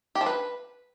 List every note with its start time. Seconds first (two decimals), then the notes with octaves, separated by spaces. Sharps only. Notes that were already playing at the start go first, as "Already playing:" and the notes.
0.15 G4
0.21 F3
0.26 B4